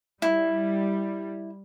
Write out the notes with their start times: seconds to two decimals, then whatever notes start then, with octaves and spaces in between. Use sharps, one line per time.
0.22 G3 E4